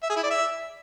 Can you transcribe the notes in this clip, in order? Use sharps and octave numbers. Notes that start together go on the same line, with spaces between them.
E5
G#4
E4
D5
E5